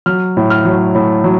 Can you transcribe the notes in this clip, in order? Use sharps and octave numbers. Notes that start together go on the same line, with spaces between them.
F#3 F6
A2
F6
F#3
A2
F#3